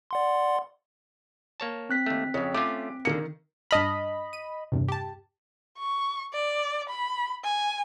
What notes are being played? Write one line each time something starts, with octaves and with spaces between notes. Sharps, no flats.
D5 F#5 C6
A#3 C#5 A5
C4 F#6 B6
D#2 A3
F2 C#3 C#5
A3 C#4 F4 D6
D3 D#3 A#3 C#7
G2 D#5 A5 B5 F6
D#7
E2 G2 C3
G4 A5
C#6
D5
B5
G#5